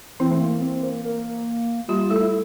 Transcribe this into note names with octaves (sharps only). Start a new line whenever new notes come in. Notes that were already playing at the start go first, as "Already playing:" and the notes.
E3 C4 E4
A3
A#3
C4
A#3
A#3
G3 F4 G4
A3 E4 A4
E4